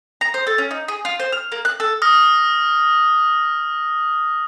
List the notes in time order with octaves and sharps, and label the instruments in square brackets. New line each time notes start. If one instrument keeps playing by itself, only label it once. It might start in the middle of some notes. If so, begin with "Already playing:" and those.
[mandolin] A#5
C5
A4
C#4
D#4
G#4
F4
C5
F6
A#3
F#6
A4
[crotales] D#6 F6 A#6